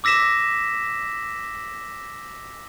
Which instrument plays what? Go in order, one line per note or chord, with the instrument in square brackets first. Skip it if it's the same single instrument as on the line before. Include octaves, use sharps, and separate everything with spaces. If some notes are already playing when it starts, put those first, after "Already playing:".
[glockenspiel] D6 E6 A#6 B6 E7